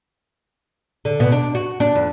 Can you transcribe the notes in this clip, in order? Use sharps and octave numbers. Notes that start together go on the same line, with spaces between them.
D3
B2
D4
F#4
D4
F2